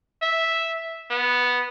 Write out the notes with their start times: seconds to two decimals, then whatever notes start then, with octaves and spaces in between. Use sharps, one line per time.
0.22 E5
1.10 B3